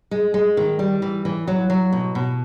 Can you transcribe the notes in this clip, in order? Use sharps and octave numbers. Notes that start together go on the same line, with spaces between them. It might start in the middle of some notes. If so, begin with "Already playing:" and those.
G#3
G#3
D#3
G3
E3
E3
F#3
F#3
B2
B2